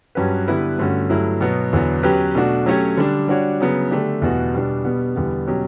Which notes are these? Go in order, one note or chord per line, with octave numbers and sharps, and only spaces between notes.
G2 F#3 C#4 F#4 B4
D3 G3 B3 E4 B4
G2 D3 A3 C#4 F#4
G2 F#3 A3 E4
B2 F#3 B3
E2 D3 F#3 B3
F#3 C#4 G4 B4
B2 A3 D4 F#4
F#3 A3 C#4 G4 C#5
D3 G3 D4
G3 D4 F#4 C#5
C#3 F#3 B3
D3 A3 D4 G4
E2 B2 G3 B3 F#4
B2 G3 B3 D4
B2 G3 B3
E2 D3 G3 B3
B2 F#3 C#4 G4